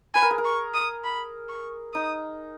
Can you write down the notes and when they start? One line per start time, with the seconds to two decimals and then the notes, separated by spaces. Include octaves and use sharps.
0.15 B4 G#5
0.22 A#4
0.31 G#4
0.38 A#4
0.45 C#6
0.74 D#6
1.04 B5
1.49 C#6
1.94 D#4 D#6